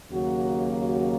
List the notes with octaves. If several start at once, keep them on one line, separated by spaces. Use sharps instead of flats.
D#2 C#3 F#3 A#3 F#4
F#4